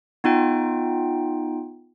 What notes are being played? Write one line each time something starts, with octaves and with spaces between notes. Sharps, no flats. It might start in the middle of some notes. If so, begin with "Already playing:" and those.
B3 D#4 F4 G5